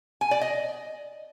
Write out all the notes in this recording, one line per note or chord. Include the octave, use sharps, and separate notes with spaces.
G#5
D5
D#5